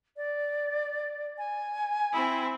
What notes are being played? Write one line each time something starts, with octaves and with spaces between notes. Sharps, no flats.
D5
G#5
C4 E4